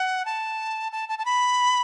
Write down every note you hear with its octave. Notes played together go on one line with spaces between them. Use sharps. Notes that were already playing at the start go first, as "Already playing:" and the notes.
Already playing: F#5
A5
A5
A5
A5
B5